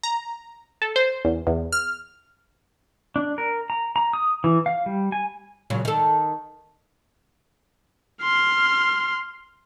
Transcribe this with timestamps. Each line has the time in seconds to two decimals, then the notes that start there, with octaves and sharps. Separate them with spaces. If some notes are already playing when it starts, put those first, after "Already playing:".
0.03 A#5
0.82 A4
0.96 C5
1.25 E2
1.47 E2
1.72 F6
3.16 D4
3.38 A#4
3.70 A#5
3.96 A#5
4.13 D#6
4.44 E3
4.66 F5
4.86 G3
5.12 G#5
5.70 A#2 C#3 F#3
5.85 D#3 A4
8.23 C6 F6